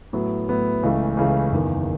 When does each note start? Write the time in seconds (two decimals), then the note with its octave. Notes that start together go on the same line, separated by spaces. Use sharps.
0.13 A2 F#3 B3 E4
0.48 A2 F#3 B3 E4
0.83 C#2 C#3 E3 A3
1.17 C#2 C#3 E3 A3
1.52 F#1 E2 D#3